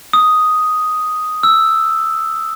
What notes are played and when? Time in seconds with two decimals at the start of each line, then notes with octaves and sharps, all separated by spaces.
0.13 D#6
1.43 E6